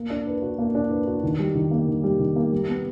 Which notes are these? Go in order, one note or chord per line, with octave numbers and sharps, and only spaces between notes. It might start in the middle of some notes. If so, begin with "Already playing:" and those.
Already playing: A#3
D4
B4
F#4
A#3
D4
B4
F#4
D#3
G3
D#3
A#3
D#3
G3
D#3
A#3
G3
B3